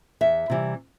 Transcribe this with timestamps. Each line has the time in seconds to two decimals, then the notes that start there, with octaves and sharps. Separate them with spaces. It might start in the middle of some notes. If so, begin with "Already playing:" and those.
0.21 E2 E5
0.50 C3 E3 G3